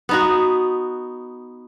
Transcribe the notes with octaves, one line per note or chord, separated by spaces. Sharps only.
B3 D#4 F#4